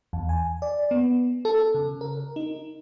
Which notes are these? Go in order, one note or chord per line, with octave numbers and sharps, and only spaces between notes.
E2
G#5
D5
B3
A4
C#3
A#4
D#4